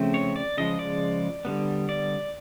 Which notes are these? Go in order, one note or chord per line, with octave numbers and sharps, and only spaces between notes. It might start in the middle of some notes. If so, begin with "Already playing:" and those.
Already playing: C#3 F3 A3 C4
C#5
D5
C#3 F3 G#3 D#5
D5
D3 G3 B3
D5